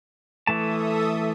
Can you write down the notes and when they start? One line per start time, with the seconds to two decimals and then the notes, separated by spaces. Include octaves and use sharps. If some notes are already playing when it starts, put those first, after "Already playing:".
0.47 E3 A3 A4 E5 A5 D#6